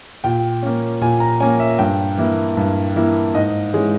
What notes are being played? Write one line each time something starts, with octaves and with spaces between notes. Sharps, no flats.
A#2 G5
A#3 C#4
A#2 G#5
A#5
A#3 C#4 G#5
E5
G2 G5
E3 A#3 E4
G2
E3 A#3 E4
G#2 D#5
E3 G#3 C#4 G#4